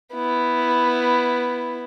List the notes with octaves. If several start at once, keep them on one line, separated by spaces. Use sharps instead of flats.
B3 E4